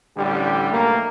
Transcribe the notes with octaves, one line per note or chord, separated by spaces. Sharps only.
A1 D3 G3 G4
B1 A3 A#3